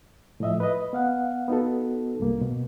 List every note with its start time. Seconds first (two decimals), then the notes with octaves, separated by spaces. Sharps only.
0.40 A2 F3 D#5 E5
0.60 B4 D#5
0.93 B3 F5 F#5
1.48 B3 D#4 F#4 A4
2.20 C2 G2 A#3
2.41 B2